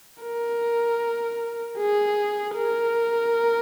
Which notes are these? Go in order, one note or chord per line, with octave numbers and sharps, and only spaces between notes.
A#4
G#4
A#4